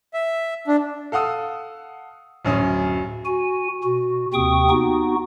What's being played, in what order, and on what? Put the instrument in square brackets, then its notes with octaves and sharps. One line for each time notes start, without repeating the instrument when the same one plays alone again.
[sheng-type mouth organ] E5
D4
[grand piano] A4 F5 F#5 D#6 E6
D1 F#2 C#4 D#6
[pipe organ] F#4 G#5
B2 F#4
D#2 C3 C4 G5 C#6 D#6
B3 D#4 F#4